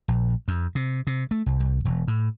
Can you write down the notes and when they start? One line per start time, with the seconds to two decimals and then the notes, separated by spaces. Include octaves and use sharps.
0.08 A#1
0.48 F2
0.75 C3
1.07 C3
1.31 A3
1.46 C2
1.60 C2
1.85 E1
2.08 A2